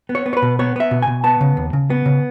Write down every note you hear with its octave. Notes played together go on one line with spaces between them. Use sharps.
B3
C#5
B3
C#5
B4
B2
B3 C#5
B3 E5
B2
B2 G#5
B3 A5
C#3
D#2
C#3
B3
C#3